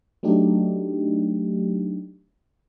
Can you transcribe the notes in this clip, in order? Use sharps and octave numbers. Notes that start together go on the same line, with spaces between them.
F#3 A3 D4 D#4 G4